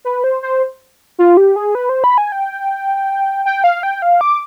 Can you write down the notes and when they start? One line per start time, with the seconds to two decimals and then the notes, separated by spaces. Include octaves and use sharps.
0.05 B4
0.24 C5
0.43 C5
1.19 F4
1.37 G4
1.56 G#4
1.75 B4
1.89 C5
2.04 B5
2.18 G#5
2.32 G5
3.45 G5
3.64 F5
3.83 G5
4.02 F5
4.21 D6